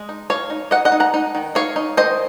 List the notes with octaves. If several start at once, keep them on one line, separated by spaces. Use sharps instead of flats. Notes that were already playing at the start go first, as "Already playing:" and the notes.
Already playing: G#3 D#5
D#4
D#4 C#5 F5
D#4
D#4 D#5 F#5
D#5 F#5
D#4
F#5 A#5
D#4
D#3
D#4 C#5 F5
D#4
D#3 C5 D#5